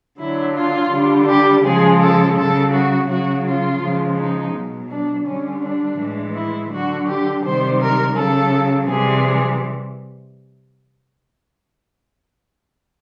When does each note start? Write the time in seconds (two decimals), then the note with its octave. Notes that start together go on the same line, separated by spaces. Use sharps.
0.19 D3 F#3 E4
0.55 F4
0.92 D3 G3
1.28 G4
1.64 C#3 F3 G#3 G#4
2.01 A4
2.36 C#3 F#3 A4
2.73 F#4
3.09 C#3 F#3 F#4
3.46 F4
3.81 C#3 F3 G#3
4.18 D#4
4.54 B2 F#3
4.90 D4
5.26 D3 G3 C#4
5.62 D4
5.98 A2 E3 G#3
6.35 E4
6.71 D3 F#3 F#4
7.07 G4
7.44 C3 D#3 G3 C5
7.80 A#4
8.16 C#3 F#3 A4
8.88 C3 E3 G3 G#4